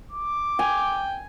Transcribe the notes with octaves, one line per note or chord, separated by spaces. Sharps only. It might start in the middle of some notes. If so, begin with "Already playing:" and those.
D6
G5 G#5